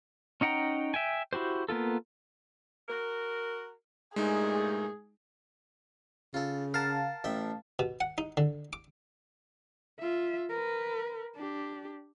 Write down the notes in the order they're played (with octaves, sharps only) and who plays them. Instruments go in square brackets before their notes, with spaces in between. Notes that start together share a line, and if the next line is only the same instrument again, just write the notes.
[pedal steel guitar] C#4 D#4 F#5 G5 A#5
E5 G5 G#5
E4 F#4 G4 C5
A#3 B3 F4 A4
[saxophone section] F#4 A#4
[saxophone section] G2 A#2 A3 [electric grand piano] G#3 D#4 [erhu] G#4
[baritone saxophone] C#3 [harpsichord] F4 A4
[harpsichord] A#4 F#5 [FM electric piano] F5 A5
[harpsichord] A1 E5 G5
B2
F#5
D#4
D3
D6
[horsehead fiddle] F4 E5
A#4 B4
D4 G4